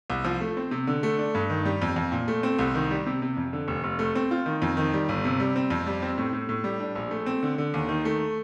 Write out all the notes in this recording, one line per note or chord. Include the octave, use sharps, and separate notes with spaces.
C2
F3
A3
C4
C3
D3
A3
D4
G2
D#3
G3
F2
F2
A#2
A3
C4
C2
D#3
G3
C3
C3
F2
D3
F1
F1
A3
C4
F4
D#3
F2
D#3
G3
G1
C3
G3
C4
F2
G3
C4
A2
A2
A2
G3
D4
A#1
A3
C4
D3
D3
D#2
D#3
A3